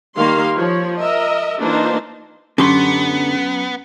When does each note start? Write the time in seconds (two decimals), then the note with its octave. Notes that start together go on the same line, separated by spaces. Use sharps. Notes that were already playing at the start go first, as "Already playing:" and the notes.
0.17 D#3 G3 A#3 F5 C6
0.55 F3 C#5
0.99 A#4 D#5 E5
1.60 E3 A#3 D4 D#4 F4 C5
2.58 F#2 D3 B3 C#4 G4 C6